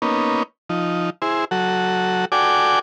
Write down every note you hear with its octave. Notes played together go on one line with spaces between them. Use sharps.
A#3 B3 C#4 D#4
F3 D#4
E4 G#4 C5
F#3 F#4 A4
F#4 A4 D5 G5 G#5 D6